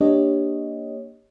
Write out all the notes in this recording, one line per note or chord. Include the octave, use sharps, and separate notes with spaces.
A#3 D4 G4 C#5 D#5